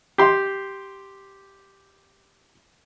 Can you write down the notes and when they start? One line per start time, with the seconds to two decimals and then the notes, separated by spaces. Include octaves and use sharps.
0.18 G4 C6